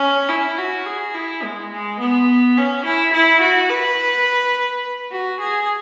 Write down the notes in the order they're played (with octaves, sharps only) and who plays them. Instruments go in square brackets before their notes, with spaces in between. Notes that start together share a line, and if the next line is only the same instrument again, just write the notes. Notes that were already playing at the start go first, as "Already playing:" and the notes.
Already playing: [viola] C#4
E4
F#4
G#4
E4
G#3
G#3
B3
C#4
E4
E4
F#4
B4
F#4
G#4